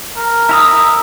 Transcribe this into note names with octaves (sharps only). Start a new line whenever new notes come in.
A#4
E4 A#5 D#6 E6